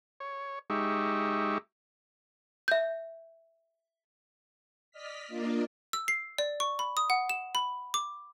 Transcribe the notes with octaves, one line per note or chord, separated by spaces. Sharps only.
C#5
G#3 D#4 G4 E5 C#6
E5 G6
D5 D#5 F6 B6
A#3 D4 F4 A#4 D5 D#5
E6
C7
D5
C#6
B5
D#6
F#5
E7
B5
D6